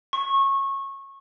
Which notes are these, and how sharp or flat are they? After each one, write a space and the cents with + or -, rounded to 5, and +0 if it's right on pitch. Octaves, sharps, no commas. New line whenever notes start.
C#6 -20